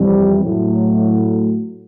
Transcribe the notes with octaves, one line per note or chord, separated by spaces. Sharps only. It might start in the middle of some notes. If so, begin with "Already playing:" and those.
Already playing: F2 C3 E3 G3
A2 F#3 A3